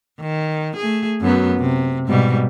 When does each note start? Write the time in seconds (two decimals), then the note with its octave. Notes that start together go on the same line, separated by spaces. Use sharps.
0.20 D#3
0.76 A3 G#4
1.21 F#2 F#3 B3
1.58 C3
2.08 G#2 B2 G3